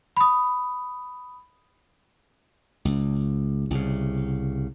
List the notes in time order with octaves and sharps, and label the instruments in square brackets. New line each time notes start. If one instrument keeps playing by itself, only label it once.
[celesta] B5 D#6
[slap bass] C#2
C2 C#3